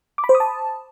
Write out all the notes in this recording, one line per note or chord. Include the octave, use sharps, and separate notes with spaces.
D6
B5
C5
D#6
A5